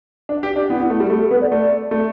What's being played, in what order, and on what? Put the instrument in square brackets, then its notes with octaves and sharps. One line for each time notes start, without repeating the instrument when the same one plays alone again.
[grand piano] D4
G4
D4
[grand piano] B3 [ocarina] E4
[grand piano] B3
A3
G3
[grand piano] A3 [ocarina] G4
[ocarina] A4
[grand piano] B3 [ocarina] B4
[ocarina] D5
[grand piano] A3 [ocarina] D5
[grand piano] A3